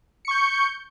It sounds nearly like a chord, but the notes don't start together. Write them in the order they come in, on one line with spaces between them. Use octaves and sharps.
C#7 C#6 G6